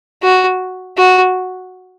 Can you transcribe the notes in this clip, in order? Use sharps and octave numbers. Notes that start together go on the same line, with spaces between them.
F#4
F#4